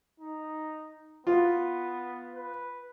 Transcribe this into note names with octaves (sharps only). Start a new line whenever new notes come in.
D#4
B3 F4
B4